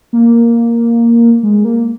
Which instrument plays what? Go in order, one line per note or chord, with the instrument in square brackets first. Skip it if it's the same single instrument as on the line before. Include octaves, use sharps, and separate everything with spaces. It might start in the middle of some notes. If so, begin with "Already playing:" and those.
[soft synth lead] A#3
G#3
A#3